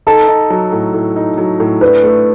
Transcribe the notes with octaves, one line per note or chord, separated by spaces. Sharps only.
D#4 A4
D#4
F#3
A2
A2
D#4
F#3
A2
D4 B4
A3